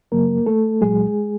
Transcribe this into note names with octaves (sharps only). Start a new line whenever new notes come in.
F#2 C#3 F#3 A#3 A#4
A3 A4
C2 A#2 F#3 G#3 G#4